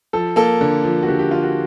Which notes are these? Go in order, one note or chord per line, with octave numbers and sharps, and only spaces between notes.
F3 A4
A#3 A4
D3
F3
F#4
D3 G4
G4
D3 F4
F#4